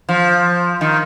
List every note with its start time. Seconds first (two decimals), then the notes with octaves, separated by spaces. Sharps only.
0.09 F3
0.81 D#3